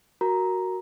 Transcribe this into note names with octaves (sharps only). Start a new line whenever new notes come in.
F#4 A#4 A#5